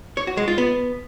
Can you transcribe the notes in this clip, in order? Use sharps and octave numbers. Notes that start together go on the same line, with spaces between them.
C#5
F#4
G#3
F4
B3